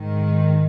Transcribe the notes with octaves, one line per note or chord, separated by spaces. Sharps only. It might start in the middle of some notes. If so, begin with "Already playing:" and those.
Already playing: G#2 D#3